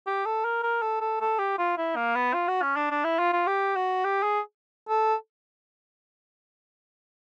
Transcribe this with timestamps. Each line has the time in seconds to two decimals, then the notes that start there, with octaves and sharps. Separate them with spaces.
0.07 G4
0.26 A4
0.45 A#4
0.63 A#4
0.82 A4
1.01 A4
1.21 A4
1.39 G4
1.58 F4
1.78 E4
1.96 A#3
2.15 B3
2.34 F4
2.48 F#4
2.62 C#4
2.76 D4
2.91 D4
3.04 E4
3.19 F4
3.33 F4
3.47 G4
3.76 F#4
4.05 G4
4.23 G#4
4.89 A4